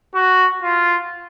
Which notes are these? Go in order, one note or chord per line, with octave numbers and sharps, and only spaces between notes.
F#4
F4